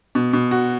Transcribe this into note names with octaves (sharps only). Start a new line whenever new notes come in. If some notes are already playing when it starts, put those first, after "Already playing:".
B2
B2
F#4